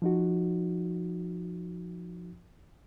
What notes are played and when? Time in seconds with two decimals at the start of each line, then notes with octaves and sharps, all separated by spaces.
0.02 F3 D#4 F#4